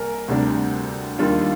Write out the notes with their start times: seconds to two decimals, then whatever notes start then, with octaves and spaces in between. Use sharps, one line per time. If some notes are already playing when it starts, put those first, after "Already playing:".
Already playing: C2 G3 A#3 A#4 G#5 A#5
0.28 D2 C3 G3 D4
1.19 D#2 D#3 G3 D4 F4